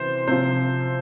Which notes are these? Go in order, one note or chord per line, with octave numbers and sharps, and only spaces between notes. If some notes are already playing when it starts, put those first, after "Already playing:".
Already playing: C3 E3 C5
C3 F3 C5